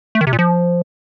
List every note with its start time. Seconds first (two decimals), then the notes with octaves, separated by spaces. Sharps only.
0.15 A3
0.21 D#3
0.27 C3
0.33 A#2
0.39 F3